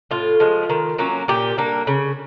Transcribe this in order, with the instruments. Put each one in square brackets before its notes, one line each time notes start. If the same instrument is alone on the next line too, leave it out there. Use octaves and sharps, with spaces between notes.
[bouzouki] A2 F4
F3 G#3
D#3
F#3 A#3 C#4
A#2 G4
G3 A#3 D4
C#3